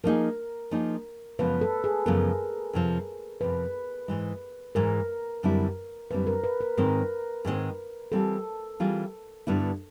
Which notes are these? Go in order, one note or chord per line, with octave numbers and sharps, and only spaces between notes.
F3 A#3 D#4 G#4 A#4
F3 A#3 D#4 G#4
F#2 C#3 F3 G#3 B3 B4
A4
G#4
F#2 C#3 F3 G#3 B3 A#4
F2 C3 F3
F2 C3 F3 B4
G#2 E3 G#3
G#2 E3 G#3 A#4
F#2 D3 G3 C4 E4
F#2 D3 G3 C4 E4 B4
A#4
B4
A#4
G#2 D#3 G#3 C4 A#4
G#2 D#3 G#3 C4
E3 G3 C4 F4 G#4 A4
E3 G3 C4 F4 G#4
G2 D3 G3 B3 E4